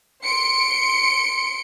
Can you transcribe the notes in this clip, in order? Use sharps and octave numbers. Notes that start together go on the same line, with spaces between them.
C6 C#7 D7